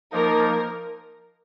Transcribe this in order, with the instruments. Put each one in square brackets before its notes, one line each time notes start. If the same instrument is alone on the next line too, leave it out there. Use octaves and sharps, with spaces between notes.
[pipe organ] F3 A#3 D#4 [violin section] A#4